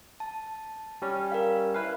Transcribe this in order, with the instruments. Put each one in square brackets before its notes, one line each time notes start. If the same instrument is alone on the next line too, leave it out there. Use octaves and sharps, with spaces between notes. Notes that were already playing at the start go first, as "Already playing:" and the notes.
[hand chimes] A5
[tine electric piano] G3 C#4
[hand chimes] A#4 F5
[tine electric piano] E4 B4 F5